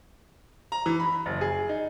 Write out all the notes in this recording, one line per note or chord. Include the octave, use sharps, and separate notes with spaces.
A#5
E3
B5
F#1
G#4
D#4